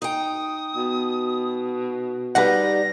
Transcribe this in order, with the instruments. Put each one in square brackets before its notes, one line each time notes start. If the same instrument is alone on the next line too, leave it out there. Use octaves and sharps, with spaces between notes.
[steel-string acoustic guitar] D#4 G5 [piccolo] D#6
[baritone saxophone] B2
[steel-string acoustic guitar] G3 D#4 [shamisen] B4 F#5 [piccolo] A#6